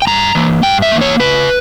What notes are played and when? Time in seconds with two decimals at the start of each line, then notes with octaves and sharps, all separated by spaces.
0.02 G5
0.07 G2 A#5
0.35 E3 A#3
0.63 G2 G5
0.82 E5
0.92 E3 A#3
1.01 C#5
1.20 C#3 B4